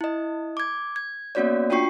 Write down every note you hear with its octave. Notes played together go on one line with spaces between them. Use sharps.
E4 D#5
D6 G#6
G#6
A#3 B3 C#4 F#4 C#5 D5
D4 F4 F#4 G5 C#6 C7